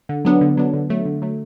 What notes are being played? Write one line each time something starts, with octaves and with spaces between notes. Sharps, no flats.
D3
F#3 B3 D4
D3
F#3 B3 D4
D3
F#3 A3
D3
F#3 A3